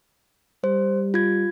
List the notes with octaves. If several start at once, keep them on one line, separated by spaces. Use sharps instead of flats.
G3 C5
F4 G#6